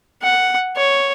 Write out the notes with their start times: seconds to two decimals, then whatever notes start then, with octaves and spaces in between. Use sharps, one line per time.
0.22 F#5
0.76 C#5